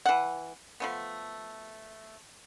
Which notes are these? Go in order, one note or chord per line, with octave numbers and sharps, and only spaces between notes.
E3 F#5
F3 A3 B3